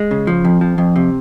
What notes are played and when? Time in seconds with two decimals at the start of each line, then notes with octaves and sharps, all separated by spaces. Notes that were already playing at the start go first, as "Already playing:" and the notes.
Already playing: G#3
0.11 C#3
0.27 F3
0.44 F2
0.61 F3
0.78 F2
0.96 C3